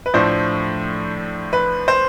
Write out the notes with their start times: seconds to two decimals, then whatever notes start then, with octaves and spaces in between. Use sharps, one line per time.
0.06 B4
0.14 A2 F3 A3 D4 C5
1.53 B4
1.88 C5